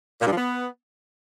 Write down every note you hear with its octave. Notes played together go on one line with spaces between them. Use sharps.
A#2
G2
F3
B3